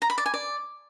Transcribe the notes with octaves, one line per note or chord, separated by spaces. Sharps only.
A#5
B5
D5
G#5
D5